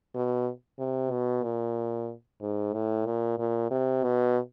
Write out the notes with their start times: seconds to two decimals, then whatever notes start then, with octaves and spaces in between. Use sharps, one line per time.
0.15 B2
0.79 C3
1.11 B2
1.44 A#2
2.41 G#2
2.73 A2
3.06 A#2
3.39 A#2
3.71 C3
4.04 B2